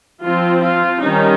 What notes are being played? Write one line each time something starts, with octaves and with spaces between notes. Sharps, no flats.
F3 C4 F4
F4
D#3 G3 C#4 D#4